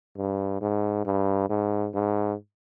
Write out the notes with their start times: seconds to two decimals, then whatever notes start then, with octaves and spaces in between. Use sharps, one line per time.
0.17 G2
0.61 G#2
1.06 G2
1.49 G#2
1.94 G#2